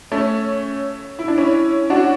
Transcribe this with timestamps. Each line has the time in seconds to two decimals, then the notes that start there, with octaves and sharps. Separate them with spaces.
0.12 A3 C#4
1.19 E4
1.28 D4
1.38 C#4 E4
1.90 D4 F#4